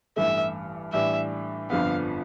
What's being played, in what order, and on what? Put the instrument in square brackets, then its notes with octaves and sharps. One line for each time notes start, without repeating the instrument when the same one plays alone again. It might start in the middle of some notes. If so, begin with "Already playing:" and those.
[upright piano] A1 G2 E3 A3 [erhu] E5
[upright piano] A2 E3 G3 D4 [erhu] E5
[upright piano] G1 F2 D3 F3 B3 [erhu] F5